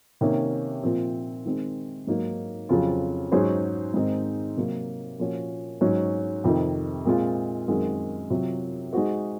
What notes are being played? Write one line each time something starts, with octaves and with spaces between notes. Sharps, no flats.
C3 D#3 A#3 C#4
A#2 F3 C4
D#3 G#3 C4
G#2 F#3 A#3 D#4
F2 C#3 F#3 C4 F4
G#2 F#3 C#4 G#4 C5
G#2 D#3 G#3 C4 D#4
C3 F#3 A#3
A#2 F3 A#3 C#4 F#4
G#2 F#3 C#4
F2 C3 D#3
A#2 G#3 C4 F4
F#2 D#3 G#3 C4 F#4
C3 F#3 C4 F4
G#3 D#4 F#4 C5